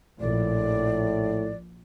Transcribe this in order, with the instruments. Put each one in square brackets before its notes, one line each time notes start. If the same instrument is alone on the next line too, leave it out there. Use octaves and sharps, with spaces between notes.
[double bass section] A#1 [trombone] A2 [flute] D5